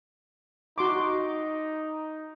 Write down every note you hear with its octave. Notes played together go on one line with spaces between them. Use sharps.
D#4 F#4 C6 D6